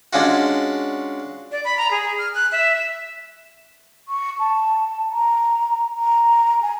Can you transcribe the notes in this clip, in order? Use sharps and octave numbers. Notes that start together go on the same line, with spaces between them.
G#3 C#4 D4 F4 F#4
D5
B5
A#5
G#4
F6
F#6
E5
C#6
A5
A#5
A#5
G#5